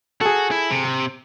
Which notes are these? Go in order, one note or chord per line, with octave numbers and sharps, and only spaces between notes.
F#4 G#4 A4
E4
C3